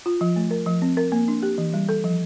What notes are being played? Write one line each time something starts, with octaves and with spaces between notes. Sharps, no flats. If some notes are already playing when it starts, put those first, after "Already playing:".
F4
F3
A3
A#4
F3
C4
A#4
A#3
D4
G4
E3
G3
A4
F3